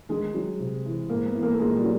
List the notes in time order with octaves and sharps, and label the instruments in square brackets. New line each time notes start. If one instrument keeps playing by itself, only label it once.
[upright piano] D#3 [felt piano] G#3
[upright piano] F#3
C3
E3
[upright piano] G#2 [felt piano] A#3
[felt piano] B3
[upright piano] E3
[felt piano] A#3
A3
[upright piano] A#2 [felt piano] G#3
[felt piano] G3
[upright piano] F#3